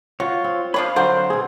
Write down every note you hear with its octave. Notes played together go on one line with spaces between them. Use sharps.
F4 F#4 C#5
C4
F3 D4 F4 C#5 F5 B5
D3 F#3 D4 F#4 C5
B2 C4 G#4